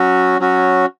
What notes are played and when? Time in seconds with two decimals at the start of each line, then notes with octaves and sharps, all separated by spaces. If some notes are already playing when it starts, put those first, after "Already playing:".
Already playing: F#3 C#4 F#4
0.40 F#3 C#4 F#4